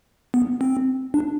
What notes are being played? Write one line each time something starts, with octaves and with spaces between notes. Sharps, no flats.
B3
C4
D4